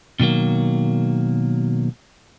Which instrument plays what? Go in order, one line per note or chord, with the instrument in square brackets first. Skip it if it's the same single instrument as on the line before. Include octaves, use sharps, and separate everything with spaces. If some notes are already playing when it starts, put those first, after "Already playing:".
[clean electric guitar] B2 D#3 F#3 A#3